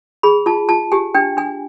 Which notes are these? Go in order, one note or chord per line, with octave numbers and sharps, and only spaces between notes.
G#4 B5
F4 A5
F4 A5
G4 G#5
D4 G5
D4 G#5